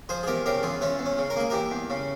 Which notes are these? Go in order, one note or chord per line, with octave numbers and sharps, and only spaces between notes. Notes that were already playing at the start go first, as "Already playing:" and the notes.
F3 G#4 C5
G#4
E2 G4 A#4
C#3 G4 A#4
E2 F4 G#4
E3 C#4 F4
E2
C#4
C#3
A#4
A#3 G#4
E3 G4 A#4
E2
C#3